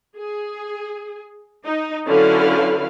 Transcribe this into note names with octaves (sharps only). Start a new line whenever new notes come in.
G#4
D#4
D3 F#3 C#4 E4 B4 F5